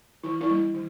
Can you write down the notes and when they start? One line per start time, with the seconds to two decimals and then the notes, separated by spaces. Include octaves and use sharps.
0.23 E3 E4
0.41 E4
0.49 G3 A#3 D4
0.74 E3